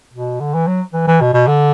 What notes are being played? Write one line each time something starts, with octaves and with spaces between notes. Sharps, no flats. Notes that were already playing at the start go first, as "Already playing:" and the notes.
B2
D3
E3
F#3
E3
E3
B2
B2
D3